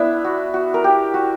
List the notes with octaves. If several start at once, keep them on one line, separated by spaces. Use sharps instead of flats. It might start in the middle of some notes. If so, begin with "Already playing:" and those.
Already playing: B3 D4 E4
F#4
F#4
A#4
G4
F#4